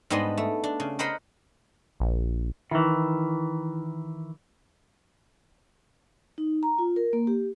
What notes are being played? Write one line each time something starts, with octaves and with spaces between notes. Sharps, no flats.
G#2 G3 B3 D4 D#5 C6
A3
D4
C#3
A#4 C5 D#5 F#5 B5 C6
A#1
D#3 E3 E4
D#4
A#5
F4
A#4
A#3
G4